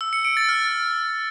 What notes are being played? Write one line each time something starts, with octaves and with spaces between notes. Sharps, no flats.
E6
C#7
D7
A6
F6